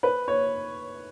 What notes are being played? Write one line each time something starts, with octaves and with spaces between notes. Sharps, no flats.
B4
C#5